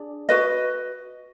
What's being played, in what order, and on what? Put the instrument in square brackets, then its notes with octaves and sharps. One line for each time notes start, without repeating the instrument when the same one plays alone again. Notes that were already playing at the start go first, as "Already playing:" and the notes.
Already playing: [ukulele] D4 G#4 D5
F#4 B4 D#5